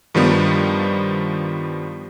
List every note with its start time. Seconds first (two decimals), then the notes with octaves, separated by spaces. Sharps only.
0.15 G2 D#3 F3 G3 B3